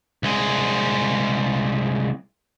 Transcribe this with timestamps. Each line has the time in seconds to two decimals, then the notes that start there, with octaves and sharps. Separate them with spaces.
0.23 C2 G#3